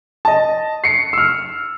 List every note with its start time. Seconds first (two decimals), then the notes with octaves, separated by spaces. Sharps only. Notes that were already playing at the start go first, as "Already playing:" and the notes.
0.25 D#5 A5
0.84 C7 C#7
1.13 E6 F6